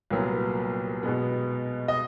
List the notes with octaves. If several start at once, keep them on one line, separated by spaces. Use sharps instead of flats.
C2 A#2 F#3 B3
B2 G#3 B3
D#5